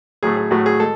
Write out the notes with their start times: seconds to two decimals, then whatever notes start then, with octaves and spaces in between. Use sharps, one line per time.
0.23 A2 F#3 A3 G#4
0.37 G#4
0.51 A2 F#3 A3 F#4
0.66 G#4
0.80 G#3 A4